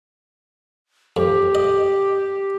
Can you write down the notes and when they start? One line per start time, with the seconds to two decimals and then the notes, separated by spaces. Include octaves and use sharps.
1.17 F2 G4
1.55 D#5